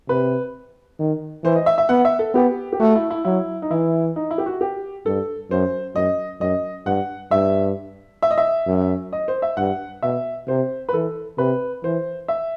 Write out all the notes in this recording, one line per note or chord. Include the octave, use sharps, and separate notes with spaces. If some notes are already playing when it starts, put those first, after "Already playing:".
C3 B4
D#3
E3 C5
D#5
E5
E5
B3 F#5
E5
A4
B3 G4
G4
A3 F#4
E4
E4
F#3 E4
D#4
E3 E4
D#4
E4
G4
F#4
G4
G2 A4
F#2 C5
F#2 D#5
F#2 D#5
G2 F#5
G2 E5
E5
D#5
E5
F#2
D#5
C5
E5
G2 F#5
B2 E5
C3 C5
B4
E3 A4
C3 B4
E3 C5
E5